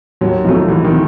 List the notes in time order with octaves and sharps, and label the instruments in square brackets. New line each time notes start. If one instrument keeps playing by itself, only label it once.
[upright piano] D#2 [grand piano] F#3
[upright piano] D#3 F#3 A3 [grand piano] F3
[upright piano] D#2 [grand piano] E3
[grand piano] D#3
[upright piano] A3